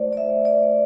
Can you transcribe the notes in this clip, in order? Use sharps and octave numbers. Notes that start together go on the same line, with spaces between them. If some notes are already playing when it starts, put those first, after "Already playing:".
Already playing: A3 E4 C5 D5
D5
E5
D5